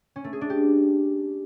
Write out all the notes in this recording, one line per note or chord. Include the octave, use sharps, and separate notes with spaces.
C#4
A3
G#4
D4
G4